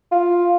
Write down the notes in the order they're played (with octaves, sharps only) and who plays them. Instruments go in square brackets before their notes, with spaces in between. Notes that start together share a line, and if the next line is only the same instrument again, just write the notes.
[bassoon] F4